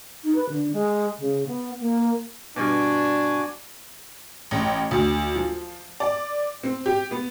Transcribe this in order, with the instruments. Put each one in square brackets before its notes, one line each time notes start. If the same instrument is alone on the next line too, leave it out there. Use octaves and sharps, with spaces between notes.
[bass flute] D#4
B4
D3
G#3
C#3
B3
A#3
[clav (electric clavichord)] G2 B2 [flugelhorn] D4 [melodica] F#4 G#5 D6
[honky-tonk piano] A1
D2
F3
D5
C4
G4
B3